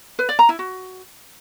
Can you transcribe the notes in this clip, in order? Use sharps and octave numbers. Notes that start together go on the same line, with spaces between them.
B4
D5
A#5
E4
F#4